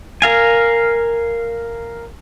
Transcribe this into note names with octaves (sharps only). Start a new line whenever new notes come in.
A#4 F5 G#5